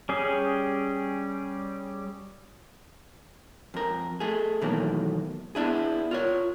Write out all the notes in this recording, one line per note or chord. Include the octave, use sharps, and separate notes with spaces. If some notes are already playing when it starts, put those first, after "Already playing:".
G3 C#4 G#4
F2 A#4
A3 G#4
B2 D#3 E3 F#3 A3 A#3
B3 D4 E4 G#4
F4 A#4 C#5